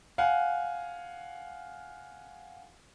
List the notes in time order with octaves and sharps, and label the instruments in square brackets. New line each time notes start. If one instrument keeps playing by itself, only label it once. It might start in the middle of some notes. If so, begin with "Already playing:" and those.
[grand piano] F5 F#5 G#5